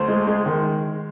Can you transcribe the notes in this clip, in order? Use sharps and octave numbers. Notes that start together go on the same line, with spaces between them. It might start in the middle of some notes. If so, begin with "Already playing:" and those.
Already playing: D2 C5
G#3
G#3
D#3